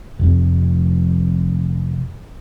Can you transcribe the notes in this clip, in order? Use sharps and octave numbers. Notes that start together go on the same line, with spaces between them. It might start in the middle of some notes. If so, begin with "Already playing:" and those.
F1 F2